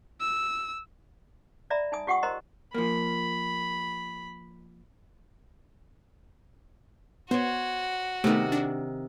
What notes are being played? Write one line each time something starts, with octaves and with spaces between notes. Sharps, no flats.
E6
D5 E5 A#5 B5
D#4 G#5 D#6
F4 G4 F#5 G5 C#6 D#6
A#4 C5 D#5 A#5 C6
F3 A#3 B5
B3 F#4 C5 C#5
C3 D#3 A3 B3
D4